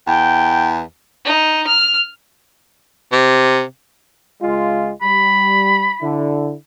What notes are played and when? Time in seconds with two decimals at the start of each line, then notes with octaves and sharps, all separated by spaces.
0.07 E2 G5
1.25 D#4
1.67 F6
3.12 C3
4.42 C#2 G#3 F4
5.02 G3 B5
6.01 D3 E4